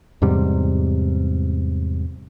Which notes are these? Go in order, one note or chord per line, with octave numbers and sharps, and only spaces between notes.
E2 G#2 C3 G3